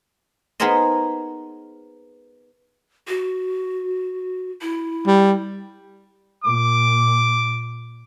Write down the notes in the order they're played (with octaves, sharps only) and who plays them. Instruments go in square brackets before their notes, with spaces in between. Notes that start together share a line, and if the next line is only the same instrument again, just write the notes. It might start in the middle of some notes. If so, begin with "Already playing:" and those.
[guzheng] B3 D#4 G#4 A#4 C5 D#5
[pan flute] F#4
E4
[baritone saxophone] G3
[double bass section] A#2 [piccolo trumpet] D6